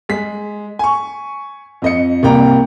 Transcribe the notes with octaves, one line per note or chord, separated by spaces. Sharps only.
G#3 B6
G#5 C#6
F2 D#5 C#7
C2 A#3 G5 A#5